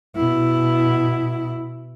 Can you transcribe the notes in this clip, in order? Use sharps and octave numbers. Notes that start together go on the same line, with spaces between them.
B2 E4